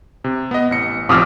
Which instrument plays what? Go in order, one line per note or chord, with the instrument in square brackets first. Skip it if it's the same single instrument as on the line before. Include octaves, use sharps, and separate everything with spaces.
[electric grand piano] C3
B3 D#5
A1 C#7
[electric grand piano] A1 C3 F3 [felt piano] D6 D#6 F6